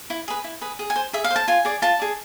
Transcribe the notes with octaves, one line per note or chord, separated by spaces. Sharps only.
E4
G#4 B4
E4
G#4 B4
G#4
G#5
C5
G#4 E5
F5
C5
A5
F4 G#5
G#4 D5
F4 A5
G#4 D5